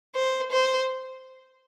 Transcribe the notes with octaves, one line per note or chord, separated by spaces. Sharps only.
C5
C5